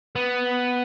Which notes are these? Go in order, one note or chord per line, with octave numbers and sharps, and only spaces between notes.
B3